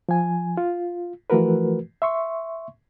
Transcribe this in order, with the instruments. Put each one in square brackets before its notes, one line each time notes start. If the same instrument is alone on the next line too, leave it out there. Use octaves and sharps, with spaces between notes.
[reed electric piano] F3 G#5
F4
E3 F3 A3 F#4 A#4 B4
E5 C6 C#6